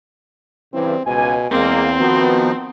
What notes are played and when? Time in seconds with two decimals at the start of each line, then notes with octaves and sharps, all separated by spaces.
0.74 G2 C#3 E3 C4
1.06 C#2 B2 G#5
1.51 E2 G#3 A#3 C4
2.00 D#3 F3 B3 D#4 F#4